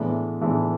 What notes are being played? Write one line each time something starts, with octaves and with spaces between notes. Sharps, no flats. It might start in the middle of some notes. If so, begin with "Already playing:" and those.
Already playing: A2 E3 G#3 B3 D4
A2 E3 G#3 B3 D4